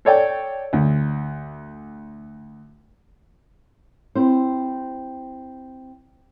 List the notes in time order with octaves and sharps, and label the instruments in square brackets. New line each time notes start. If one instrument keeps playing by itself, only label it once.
[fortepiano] A4 C#5 D5 G5
D2
[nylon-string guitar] C4 E4 G4 C5